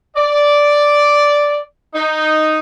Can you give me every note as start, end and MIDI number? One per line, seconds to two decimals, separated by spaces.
0.17 1.58 74
1.94 2.59 63